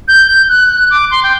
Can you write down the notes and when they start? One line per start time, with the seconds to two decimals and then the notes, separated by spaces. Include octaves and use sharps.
0.08 G6
0.28 G6
0.49 F#6
0.70 F#6
0.91 D6
1.11 C6
1.23 G5